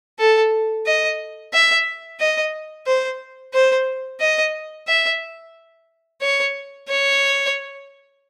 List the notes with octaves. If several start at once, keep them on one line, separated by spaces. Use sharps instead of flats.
A4
D#5
E5
D#5
C5
C5
D#5
E5
C#5
C#5